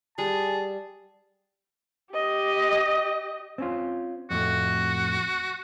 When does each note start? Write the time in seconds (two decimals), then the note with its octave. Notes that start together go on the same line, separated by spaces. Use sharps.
0.18 G3 G#4 A5
2.13 G4 D#5
3.58 C4 C#4 F4
4.30 F2 A2 A3 F#4